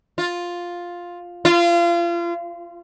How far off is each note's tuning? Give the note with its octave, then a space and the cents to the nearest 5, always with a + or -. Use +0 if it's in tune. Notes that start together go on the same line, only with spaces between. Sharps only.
F4 +5
F4 -30